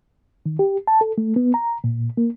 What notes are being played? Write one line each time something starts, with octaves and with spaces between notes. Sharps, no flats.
D#3
G4
A5
A4
A3
B3
A#5
A#2
A#3